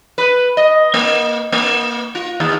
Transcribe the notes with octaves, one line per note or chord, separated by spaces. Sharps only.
B4
D#5
A#3
A#3
F4
D#2